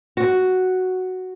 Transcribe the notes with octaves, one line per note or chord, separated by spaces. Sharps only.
F#4